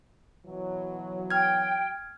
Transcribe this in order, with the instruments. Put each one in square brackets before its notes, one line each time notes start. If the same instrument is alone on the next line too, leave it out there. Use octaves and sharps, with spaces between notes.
[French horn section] B2 E3 F#3
[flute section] G5 [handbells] F6 G#6